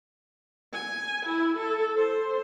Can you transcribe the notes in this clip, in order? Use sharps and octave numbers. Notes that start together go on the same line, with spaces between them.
G#5
E4
A4
C5